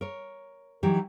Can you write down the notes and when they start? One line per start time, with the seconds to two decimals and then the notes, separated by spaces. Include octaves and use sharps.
0.01 A#4 C#5
0.83 E3 F#3 D#4 G4